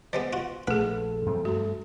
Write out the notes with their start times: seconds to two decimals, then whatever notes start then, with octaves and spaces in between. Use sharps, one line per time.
0.13 G3 G#3 B3 C5
0.33 F4 F#4
0.67 A#1 A3 G#4 A4 B4
1.26 F#2 F3 C4
1.45 G2 A3 F#4